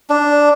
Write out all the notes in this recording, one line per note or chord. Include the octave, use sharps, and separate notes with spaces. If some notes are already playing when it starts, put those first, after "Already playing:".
D4